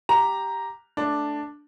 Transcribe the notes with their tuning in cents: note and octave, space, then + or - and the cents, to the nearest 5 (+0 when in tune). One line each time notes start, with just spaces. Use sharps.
G4 +0 A#5 +0
A3 +0 D4 +0